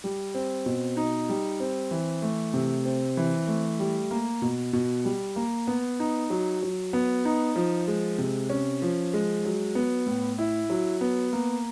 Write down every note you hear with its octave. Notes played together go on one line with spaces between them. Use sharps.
G3
C4
B2
D#4
G3
C4
E3
A3
C3
C4
E3
A3
G3
A#3
B2
B2
G3
A#3
B3
D#4
F#3
F#3
B3
D#4
F3
G#3
C3
C#4
F3
G#3
F#3
B3
A2
E4
F#3
B3
A#3